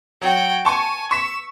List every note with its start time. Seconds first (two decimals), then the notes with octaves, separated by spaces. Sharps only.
0.21 F#3 F#4 G5
0.65 G#5 A5 C#6
1.11 C#6 E6 B6